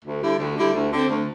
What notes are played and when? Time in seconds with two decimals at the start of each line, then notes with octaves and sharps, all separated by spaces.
0.04 D2
0.22 D3 G3 E4
0.39 D2
0.56 D3 G3 E4
0.73 D2
0.91 D3 C4
1.08 D2